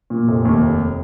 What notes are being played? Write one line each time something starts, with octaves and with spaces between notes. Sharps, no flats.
A#2
F1
D#2
F1